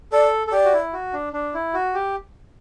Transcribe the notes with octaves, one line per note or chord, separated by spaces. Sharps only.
A4 D5
A4
G4 D5
F#4
E4
F#4
D4
D4
E4
F#4
G4